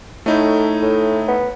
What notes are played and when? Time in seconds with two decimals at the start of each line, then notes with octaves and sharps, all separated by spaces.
0.26 A2 A3 D#4 E4
0.82 A2
1.28 B3